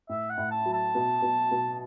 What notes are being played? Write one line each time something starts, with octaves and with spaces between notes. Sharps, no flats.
A2 E5
F#5
A2
A5
F#3
A5
B2
B2
B2